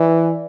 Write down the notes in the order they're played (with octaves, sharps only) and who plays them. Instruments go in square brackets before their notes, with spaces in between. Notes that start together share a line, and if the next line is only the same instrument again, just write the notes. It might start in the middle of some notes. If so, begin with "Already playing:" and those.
Already playing: [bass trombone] E3 [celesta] D5